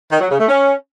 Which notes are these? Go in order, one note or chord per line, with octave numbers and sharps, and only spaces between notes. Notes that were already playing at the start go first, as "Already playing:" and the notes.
D#3
F#3
C#3
A3
C#4